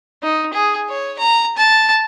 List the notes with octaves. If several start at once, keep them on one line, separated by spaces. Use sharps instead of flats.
D#4
G#4
C#5
A#5
A5